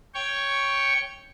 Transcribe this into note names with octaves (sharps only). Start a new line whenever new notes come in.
C#5 G5 C#6